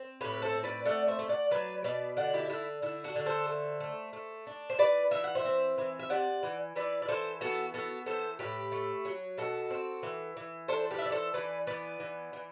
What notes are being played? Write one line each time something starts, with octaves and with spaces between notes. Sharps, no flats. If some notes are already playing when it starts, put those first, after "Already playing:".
Already playing: C4
A2 G4 B4
B4
A4 C5
C4
B4 D5
A3 D5 F#5
C5 E5
A3
D5 F#5
F#3 B4 D5
B2 B4 D5
D3 D5 F#5
E4 G4
D3 E4
D3 E4
D4 F#4
D3
A4 C5
A3
A3
A3
D4
C5
E3 B4 D5
E3 E5
F#5
C5 E5
C4
E3
E5
C3 D5 F#5
E3
E3 B4 D5
D5
E3 A4 C5
B3 F#4 A4
B3 F#4 A4
E3 A4 C5
A2 G4 B4
A3
F#3
B2 F#4 A4
C4
E3
E3
D4 A4 C5
G4 B4
E5
E3 D5
A4 C5
E3 B4 D5
B3 B4 D5
E3
E3